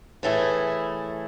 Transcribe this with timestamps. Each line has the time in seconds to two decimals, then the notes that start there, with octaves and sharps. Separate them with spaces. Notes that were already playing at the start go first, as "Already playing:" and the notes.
0.23 A2 E3 A3 E4 G#4